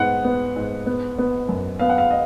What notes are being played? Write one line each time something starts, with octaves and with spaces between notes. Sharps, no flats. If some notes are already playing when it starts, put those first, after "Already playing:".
Already playing: G#2 B3 F#5
B3
G#2
B3
B3
F#2
B3 F5
F#5
F5
D#5